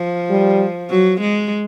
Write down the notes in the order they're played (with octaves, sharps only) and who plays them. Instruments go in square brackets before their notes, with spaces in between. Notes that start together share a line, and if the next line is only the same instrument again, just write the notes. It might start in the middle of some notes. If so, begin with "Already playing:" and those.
Already playing: [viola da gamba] F3
[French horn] G3
[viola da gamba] F#3
G#3